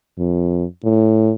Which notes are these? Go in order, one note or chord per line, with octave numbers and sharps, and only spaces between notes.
F2
A2